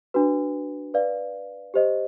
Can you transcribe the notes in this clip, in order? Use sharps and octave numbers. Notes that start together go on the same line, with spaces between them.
D4 F#4 B4
B4 D5 F5
G4 C5 D#5